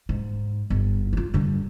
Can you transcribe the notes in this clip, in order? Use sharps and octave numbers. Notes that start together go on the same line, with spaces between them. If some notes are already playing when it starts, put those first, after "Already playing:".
G#2
G1
E4 F4
G2 D3